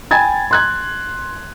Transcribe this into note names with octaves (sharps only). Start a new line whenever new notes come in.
G5 G#5 B5 G#6 A6
C6 F#6 G#6